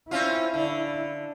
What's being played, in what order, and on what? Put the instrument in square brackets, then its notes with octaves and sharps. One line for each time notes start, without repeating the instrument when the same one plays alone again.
[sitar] C4 C#4 F4 [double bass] E4
[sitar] D3